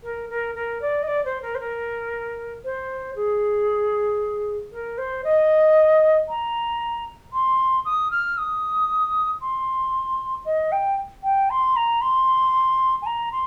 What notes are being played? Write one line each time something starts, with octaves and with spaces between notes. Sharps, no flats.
A#4
A#4
A#4
D5
D#5
D5
C5
A#4
C5
A#4
C5
G#4
A#4
C5
D#5
A#5
C6
D#6
F6
D#6
C6
D#5
G5
G5
C6
A#5
C6
G#5
A#5
C6